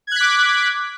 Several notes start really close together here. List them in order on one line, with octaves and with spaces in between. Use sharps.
G#6 F#6 B6 D6